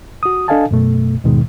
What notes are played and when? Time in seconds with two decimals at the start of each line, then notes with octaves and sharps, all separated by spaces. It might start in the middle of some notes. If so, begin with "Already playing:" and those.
0.23 F#4 D#6
0.48 D4 A4 D#5 F5 G#5 A5
0.71 F#2 B2 A3
1.24 D#2 G#2 B2 D#3 G#3